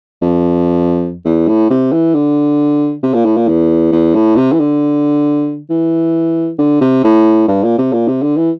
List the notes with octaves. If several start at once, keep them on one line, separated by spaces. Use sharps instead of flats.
F2
E2
A2
C3
E3
D3
C3
A#2
A2
A#2
E2
E2
A2
C3
E3
D3
E3
D3
C3
A2
G2
A#2
C3
A#2
C3
D3
E3